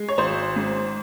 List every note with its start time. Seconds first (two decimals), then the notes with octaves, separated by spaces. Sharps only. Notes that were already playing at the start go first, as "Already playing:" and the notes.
Already playing: G#3
0.09 C#5
0.18 G#1 C5
0.56 G#2